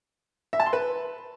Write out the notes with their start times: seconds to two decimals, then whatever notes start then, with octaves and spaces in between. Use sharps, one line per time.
0.53 E5
0.60 A5
0.66 C6
0.73 B4